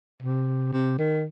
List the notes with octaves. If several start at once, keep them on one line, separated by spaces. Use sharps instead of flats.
C3
C3
D#3